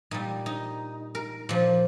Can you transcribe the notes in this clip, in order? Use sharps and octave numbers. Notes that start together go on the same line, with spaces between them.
A#2 G3 D#4
D#4
A#4
A#2 F3